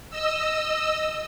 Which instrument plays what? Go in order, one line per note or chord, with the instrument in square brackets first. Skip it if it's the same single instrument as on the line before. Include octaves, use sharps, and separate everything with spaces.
[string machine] D#5 E6